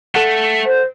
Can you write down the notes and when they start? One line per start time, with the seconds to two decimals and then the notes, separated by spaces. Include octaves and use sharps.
0.15 A3 A4 F#5
0.66 C5